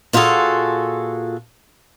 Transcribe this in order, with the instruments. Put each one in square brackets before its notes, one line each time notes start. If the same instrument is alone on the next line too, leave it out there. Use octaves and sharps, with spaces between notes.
[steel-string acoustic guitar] A#2 F4 F#4 G#4 A4